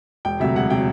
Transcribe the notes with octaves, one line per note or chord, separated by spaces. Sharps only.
E1 G5
D2 C3 F#3 E5
E1 F#5
C3 F#3 G5